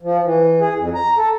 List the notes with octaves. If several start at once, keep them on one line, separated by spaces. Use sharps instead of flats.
F3
E3
G#4
F2
A#5
A4